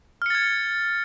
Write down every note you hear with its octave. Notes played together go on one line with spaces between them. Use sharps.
F6 G#6 A6 C#7